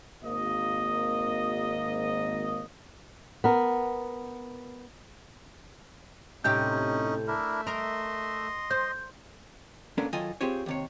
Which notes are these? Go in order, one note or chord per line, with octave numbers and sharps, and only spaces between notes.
G#1 A#3 D#5
B3 A#4
A2 C3 C#4 D#4 G4 G6
A3 D4 E4 A#4 E5
A#4 D#5 C6
C5 G6
A#3 B3 C#4 D4 A4 A#4
D#3 F#3 F4 A4 D#5 G#5
C4 F4 G4 G#4 C#5
D#2 C3 C#5